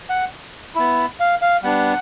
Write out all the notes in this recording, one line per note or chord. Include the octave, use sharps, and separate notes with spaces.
F#5
B3 E4
F5
F5
G3 B3 D4 F#5